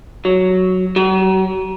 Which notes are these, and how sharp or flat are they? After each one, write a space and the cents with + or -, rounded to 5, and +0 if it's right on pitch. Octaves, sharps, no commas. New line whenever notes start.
F#3 +0
F#3 +40